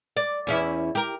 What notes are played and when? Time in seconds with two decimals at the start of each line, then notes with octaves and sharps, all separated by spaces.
0.17 D5
0.47 E2 C#4 E4
0.95 G4 A#4